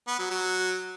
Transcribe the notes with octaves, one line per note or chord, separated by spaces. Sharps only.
B3
F#3
F#3